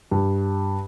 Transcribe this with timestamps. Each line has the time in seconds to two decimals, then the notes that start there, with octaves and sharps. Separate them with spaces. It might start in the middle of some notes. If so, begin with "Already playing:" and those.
0.11 G2